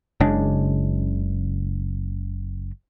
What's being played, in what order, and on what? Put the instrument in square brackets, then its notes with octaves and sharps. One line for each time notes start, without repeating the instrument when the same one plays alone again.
[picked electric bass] F#1 C#3 G#3 D4